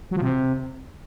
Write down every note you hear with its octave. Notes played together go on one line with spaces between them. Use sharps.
F#3
F3
C3